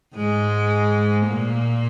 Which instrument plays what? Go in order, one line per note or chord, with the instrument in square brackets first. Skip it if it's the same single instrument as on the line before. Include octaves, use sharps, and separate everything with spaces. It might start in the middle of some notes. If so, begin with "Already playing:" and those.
[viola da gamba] G#2 G#3
A#2 A#3